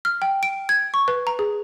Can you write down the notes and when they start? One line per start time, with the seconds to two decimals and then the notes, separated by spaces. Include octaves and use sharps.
0.05 F6
0.22 G5
0.43 D7
0.69 G#6
0.94 C#6
1.08 B4
1.27 A#5
1.39 G#4